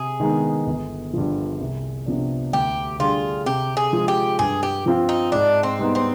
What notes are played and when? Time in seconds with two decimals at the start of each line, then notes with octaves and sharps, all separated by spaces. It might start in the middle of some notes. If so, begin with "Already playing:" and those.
Already playing: C3 G#4
0.20 D#3 G#3 B3 D#4
0.66 G1
1.13 G2 D3 F3
1.60 C2
2.06 C3 F3 B3 D4
2.53 D2 G4
2.99 D3 G3 D4 F4 G#4
3.46 C3 G4
3.77 G#4
3.93 F3 G#3
4.08 G4
4.39 G2 G#4
4.63 G4
4.86 F3 C4 F4
5.09 D#4
5.32 G#2 D4
5.63 C4
5.79 G3 B3 D#4
5.95 C4